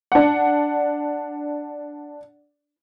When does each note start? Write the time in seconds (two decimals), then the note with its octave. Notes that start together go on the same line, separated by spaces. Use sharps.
0.12 D4 F#5